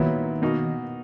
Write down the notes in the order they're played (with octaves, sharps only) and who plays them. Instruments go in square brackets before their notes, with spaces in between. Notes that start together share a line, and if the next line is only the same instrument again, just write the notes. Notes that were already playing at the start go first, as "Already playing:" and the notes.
Already playing: [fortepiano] A#2 F#3 B3 E4 [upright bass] D#3
[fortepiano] B2 A#3 D#4 F#4